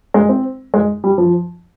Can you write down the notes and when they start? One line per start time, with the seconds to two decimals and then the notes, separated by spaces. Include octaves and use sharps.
0.14 G#3
0.29 C4
0.74 G#3
1.04 G3
1.18 F3